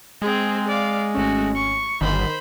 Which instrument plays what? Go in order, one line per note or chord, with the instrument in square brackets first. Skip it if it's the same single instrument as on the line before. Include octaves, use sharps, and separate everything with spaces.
[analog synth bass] G#3 [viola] C4 G#4
[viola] D5 F5
[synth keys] G#1 C#4 [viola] A3 F#4
[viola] C#6
[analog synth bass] G1 [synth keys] D#3 [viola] C5 B5